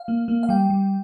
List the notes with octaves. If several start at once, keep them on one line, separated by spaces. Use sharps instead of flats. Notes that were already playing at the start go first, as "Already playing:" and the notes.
Already playing: F5
A#3
A#3
F5
G3 G5
G3